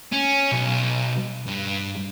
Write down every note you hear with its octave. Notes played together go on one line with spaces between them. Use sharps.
C#4
B1
G2